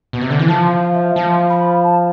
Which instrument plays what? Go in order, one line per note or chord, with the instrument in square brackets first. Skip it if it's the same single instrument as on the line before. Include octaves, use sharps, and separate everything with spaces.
[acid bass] B2
C3
D3
E3
[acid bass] F3 [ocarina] A5
[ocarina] F5
E5
[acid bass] F3 [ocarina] A5
[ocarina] B5
A5